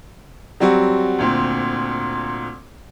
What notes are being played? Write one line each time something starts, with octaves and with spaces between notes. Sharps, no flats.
F#3 G3 C4 F#4
D2 A#2 C4